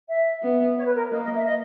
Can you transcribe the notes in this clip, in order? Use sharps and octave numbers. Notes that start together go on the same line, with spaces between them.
E5
B3
C#5
B4
A#4
A#3 D#5
D#5
E5
D#5